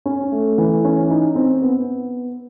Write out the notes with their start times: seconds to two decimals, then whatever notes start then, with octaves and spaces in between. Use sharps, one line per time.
0.06 C#4
0.32 A3
0.58 E3
0.85 C#4
1.10 D#4
1.36 C4
1.62 B3